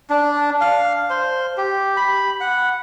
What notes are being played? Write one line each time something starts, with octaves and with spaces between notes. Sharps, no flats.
D4
F5
C5
G4
B5
F#5